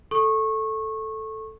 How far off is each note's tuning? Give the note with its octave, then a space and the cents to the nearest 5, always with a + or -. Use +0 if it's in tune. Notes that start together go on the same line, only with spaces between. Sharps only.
A4 +0 C#6 -20